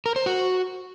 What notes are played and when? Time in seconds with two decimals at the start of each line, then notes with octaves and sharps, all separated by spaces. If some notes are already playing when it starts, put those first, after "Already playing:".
0.06 A#4
0.16 C5
0.26 F#4